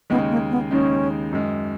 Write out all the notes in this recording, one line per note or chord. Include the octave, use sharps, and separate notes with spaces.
D#2 C#3 G#3 B3 D#4
A#3
B3
D#2 C#3 G#3 C#4 D#4
F#2 D#3 G#3